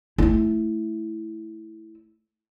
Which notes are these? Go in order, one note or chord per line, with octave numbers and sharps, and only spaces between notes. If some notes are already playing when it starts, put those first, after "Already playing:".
A3 E4